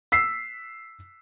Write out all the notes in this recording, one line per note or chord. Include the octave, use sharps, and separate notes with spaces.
E6 B6 C7